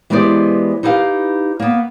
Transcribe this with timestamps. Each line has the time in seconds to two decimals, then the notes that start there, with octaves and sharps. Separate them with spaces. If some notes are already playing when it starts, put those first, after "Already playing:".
0.10 E3 G#3 B3 G4 C5 D5
0.83 D#4 E4 G4 B4 D5 F5
1.60 A#3 B3